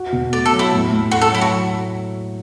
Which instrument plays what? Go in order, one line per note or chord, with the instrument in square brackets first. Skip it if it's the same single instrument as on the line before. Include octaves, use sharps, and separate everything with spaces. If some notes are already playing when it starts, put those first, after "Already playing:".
Already playing: [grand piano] F#4
B2
[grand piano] A3 [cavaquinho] D5
[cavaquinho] A4
[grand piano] F#3
[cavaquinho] E4
[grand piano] A2
A2
[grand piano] A3 [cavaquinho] F#4
[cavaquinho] A4
[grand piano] F#3 [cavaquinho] E4
[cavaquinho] F#4